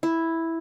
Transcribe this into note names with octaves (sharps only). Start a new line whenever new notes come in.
E4